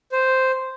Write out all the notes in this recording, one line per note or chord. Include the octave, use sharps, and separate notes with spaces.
C5